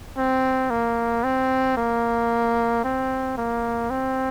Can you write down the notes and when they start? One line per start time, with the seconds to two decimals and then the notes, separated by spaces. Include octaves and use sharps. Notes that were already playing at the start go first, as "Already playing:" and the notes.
0.17 C4
0.70 A#3
1.24 C4
1.77 A#3
2.84 C4
3.37 A#3
3.90 C4